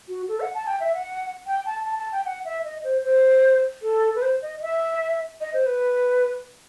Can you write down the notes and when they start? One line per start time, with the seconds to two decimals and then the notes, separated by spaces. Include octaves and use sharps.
0.08 F#4
0.28 A4
0.41 F#5
0.55 A5
0.67 G5
0.80 E5
0.94 F#5
1.47 G5
1.66 A5
1.86 A5
1.99 A5
2.12 G5
2.25 F#5
2.45 E5
2.64 D#5
2.84 C5
3.04 C5
3.83 A4
4.16 B4
4.22 C5
4.42 D#5
4.62 E5
5.41 D#5
5.54 C5
5.66 B4